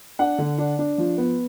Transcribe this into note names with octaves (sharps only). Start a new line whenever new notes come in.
D4 F#5
D3
D4
D4
F3
B3